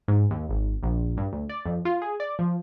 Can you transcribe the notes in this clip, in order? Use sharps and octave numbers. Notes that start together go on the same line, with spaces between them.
G#2
D#2
G#1
A#1
G2
D2
D5
F2
F4
G#4
D5
F3